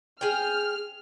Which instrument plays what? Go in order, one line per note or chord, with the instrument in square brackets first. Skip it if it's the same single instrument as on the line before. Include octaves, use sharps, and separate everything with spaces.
[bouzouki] G#4 G5 [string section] F6